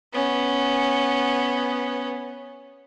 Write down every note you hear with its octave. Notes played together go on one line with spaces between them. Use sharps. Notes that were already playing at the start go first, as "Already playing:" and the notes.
B3 C#4